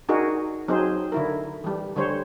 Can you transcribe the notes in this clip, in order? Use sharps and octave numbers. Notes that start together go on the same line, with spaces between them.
D4 D#4 F#4 G#4 A#4
F#3 C4 D#4 G#4 C5
D3 E4 A#4
E3 G3
D3 G3 C5 C#5